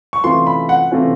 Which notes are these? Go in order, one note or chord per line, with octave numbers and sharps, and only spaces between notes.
C#6
C3 E3 A3 C#4 F4 C6
B5
F#5
C3 E3 A3 C#4 F4